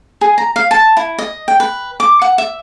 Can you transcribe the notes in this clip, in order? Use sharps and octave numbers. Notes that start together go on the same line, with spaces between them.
G#4
A#5
F5
A5
E4
D#5
G5
B4
D6
F#5
E5